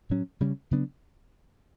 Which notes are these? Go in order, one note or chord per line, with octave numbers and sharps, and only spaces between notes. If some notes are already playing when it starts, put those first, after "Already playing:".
A2 F#3 C#4
C#3 G3 C#4
C#3 F#3 B3 D4